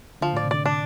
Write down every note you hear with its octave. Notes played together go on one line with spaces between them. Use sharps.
D3 F3
A2 D5
C3
D3 D5
D4